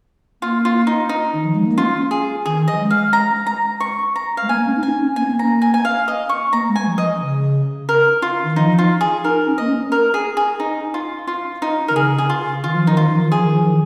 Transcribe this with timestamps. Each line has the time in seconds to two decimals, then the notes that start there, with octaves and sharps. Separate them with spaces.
0.42 A#3 F4
0.65 F4
0.87 D#4
1.09 D#4
1.34 D#3
1.45 F3
1.55 G#3
1.66 A#3
1.77 C#4 F4
2.11 G#4
2.46 D#3 G#4
2.68 F3 D#5
2.80 G#3
2.90 F5
3.13 A#5
3.47 A#5
3.80 C#6
4.16 A#5
4.37 F5
4.42 G#3
4.48 A#3 G#5
4.59 A#3
4.66 C#4
4.76 D#4
4.83 C#4 G#5
5.00 C#4
5.16 A#3 G#5
5.24 C#4
5.31 A#3
5.39 A#5
5.62 G#5
5.74 G#5
5.85 F5
6.08 D#5
6.29 C#6
6.53 A#3 A#5
6.69 G#3
6.75 G#5
6.86 F3
6.98 D#5
7.21 C#3
7.89 A#4
8.22 F4
8.44 D#3
8.56 F3 D#4
8.78 F4
9.01 G#4
9.23 D#4 A#4
9.46 C#4
9.58 A#3 D#5
9.69 C#4
9.92 A#4
10.14 G#4
10.37 G#4
10.60 D#4
10.94 F4
11.27 F4
11.62 D#4
11.88 D#3 A#4
11.95 C#3 G#4
12.18 G#4
12.30 F4
12.64 D#3 F4
12.75 F3
12.87 D#3 D#4
12.97 F3 F4
13.13 D#3
13.25 F3
13.32 G#4
13.38 D#3
13.50 F3
13.62 D#3